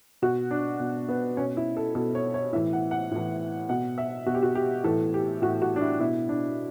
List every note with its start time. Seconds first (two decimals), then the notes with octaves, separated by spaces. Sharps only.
0.22 B2 F#4
0.51 D4
0.80 B2
1.09 B3
1.37 B2 C#4
1.57 E4
1.77 A4
1.95 B2 A4
2.15 C#5
2.34 C#5
2.53 A2 E3 E5
2.73 F#5
2.91 F#5
3.11 A2 E3
3.69 B2 F#5
3.98 E5
4.27 B2 F#4
4.35 G4
4.43 F#4
4.55 G4
4.84 A2 E3 A4
5.14 G4
5.42 A2 E3 F#4
5.62 F#4
5.76 D4
5.81 E4
6.00 B2 E4
6.29 D4